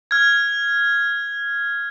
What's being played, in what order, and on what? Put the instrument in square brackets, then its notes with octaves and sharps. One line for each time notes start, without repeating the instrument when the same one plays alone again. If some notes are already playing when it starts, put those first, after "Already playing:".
[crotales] F6 G#6